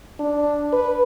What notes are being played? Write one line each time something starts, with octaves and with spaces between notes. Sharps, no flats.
D4
B4